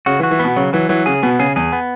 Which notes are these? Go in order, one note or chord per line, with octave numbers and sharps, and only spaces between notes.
C#3 F#4
E3
F#4
E3
B2 B3
C#3 F#3
E3 F#3
E3 F#3
C#3 G#4
B2 B3
C#3 G#4
E2 G#4
B3